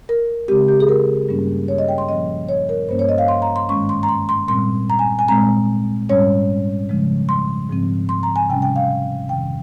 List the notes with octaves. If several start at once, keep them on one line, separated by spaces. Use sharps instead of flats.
A#4
C#3 G#3 C4 G4
G4
G#4
A#4
G2 G3 A#3 C#4
C#5
D#5
G5
C6
A#2 F3 A#3 C#4 D#5
C#5
A#4
G2 G3 A#3 C#4 C5
C#5
D#5
F5
C6
A#5
C6
G#2 D#3 G#3 C#4 C#6
C6
A#5
C6
C6
A#2 G3 C4 C6
A#5
G#5
G#5
A#2 G#3 C4 A#5
G#2 G3 C#4 C#5
C#3 F3 G#3
C6
G#2 F3 C4
C6
A#5
G#5
C3 G3 C#4 G5
G5
F5
F2 C3 D#3 G5